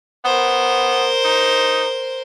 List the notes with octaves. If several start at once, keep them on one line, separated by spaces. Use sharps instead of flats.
B3 A#4 C5
D#4